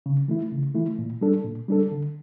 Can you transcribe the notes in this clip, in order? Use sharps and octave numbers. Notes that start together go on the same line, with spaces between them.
C#3
E3 A3 E4
C#3
E3 A3 E4
A#2
G3 D4 A4
A#2
G3 D4 A4
D3